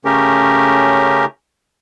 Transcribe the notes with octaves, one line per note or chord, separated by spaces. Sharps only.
C#3 A3 C#4 G4 A#4